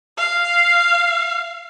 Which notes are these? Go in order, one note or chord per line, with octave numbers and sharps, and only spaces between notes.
F5